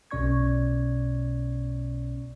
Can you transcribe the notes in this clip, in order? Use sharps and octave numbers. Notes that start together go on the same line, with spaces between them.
B1 B2 C#4 D5 C#6 G#6